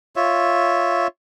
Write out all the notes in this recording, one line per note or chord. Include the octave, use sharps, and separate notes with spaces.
F4 C#5 E5